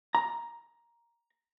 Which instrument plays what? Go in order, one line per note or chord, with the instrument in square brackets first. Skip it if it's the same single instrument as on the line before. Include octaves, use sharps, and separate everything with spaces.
[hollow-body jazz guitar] A#5